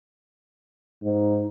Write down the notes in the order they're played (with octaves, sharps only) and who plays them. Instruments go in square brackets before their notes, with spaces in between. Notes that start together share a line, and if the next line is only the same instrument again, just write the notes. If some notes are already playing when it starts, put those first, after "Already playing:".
[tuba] G#2 [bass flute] D#4